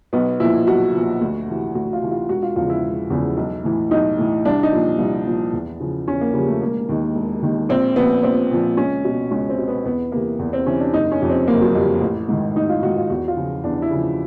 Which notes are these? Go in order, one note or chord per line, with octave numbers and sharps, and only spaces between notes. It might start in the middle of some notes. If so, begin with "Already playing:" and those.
B1 B3
A#2 F3 E4
B1 F#4
A#2 F3
D2
C3 E3
D2 F#4
F4
C3 E3
F4
E1 F#4
F4
E2 C#3 F3 F4
E4
E1
E2 C#3 F3
B1
A2 E3
B1 D#4
A2 E3
C2 D4
D#4
A#2 F3
C2
A#2 F3
E2
C#3 F3
E2 C#4
A#3
C#3 F3 G3
A3
E1 A#3
D#2 D#3
E1
D#2 D#3
A#1 C4
A#2 F3 B3
A#1 C4
A#2 F3
C#2 C#4
B2
C#2 C#4
C4
B2
B3
E2 B3
C3 E3 A#3
E2
C4
C3 E3 C#4
D4
F#1 D#4
C#4
F2 C3
C4
F#1 A#3
F#3
F2 C3 G3
A1
G#2 D#3
A1 D#4
F4
G#2 D#3 F#4
F4
E2 F#4
F4
C#3 F3
E2 D4
E4
C#3 F3